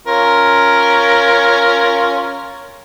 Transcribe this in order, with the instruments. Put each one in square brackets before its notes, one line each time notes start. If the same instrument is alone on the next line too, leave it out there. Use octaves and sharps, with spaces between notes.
[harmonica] C#4 F4 A#4